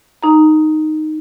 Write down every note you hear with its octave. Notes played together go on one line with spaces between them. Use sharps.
D#4 A#5